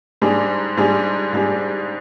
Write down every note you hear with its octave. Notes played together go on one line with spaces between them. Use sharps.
G#2 G3 D4 G#4
G#2 G3 D4 G#4
G#2 G3 D4 G#4